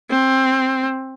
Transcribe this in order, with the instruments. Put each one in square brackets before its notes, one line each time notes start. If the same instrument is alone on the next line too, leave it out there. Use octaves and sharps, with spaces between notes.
[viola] C4